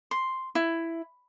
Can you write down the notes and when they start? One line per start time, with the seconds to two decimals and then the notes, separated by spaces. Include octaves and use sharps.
0.11 C6
0.55 E4